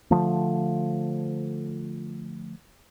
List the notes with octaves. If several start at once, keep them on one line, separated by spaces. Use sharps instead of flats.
D3 F3 A3